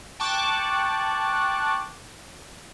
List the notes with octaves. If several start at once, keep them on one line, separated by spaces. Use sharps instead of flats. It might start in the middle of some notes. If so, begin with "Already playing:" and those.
G5 A5 C#6 D6 F#6